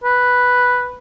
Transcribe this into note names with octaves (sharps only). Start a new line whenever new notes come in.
B4